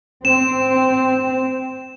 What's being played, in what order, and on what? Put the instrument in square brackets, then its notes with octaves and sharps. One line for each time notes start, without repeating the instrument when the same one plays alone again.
[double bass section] C4 [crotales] E7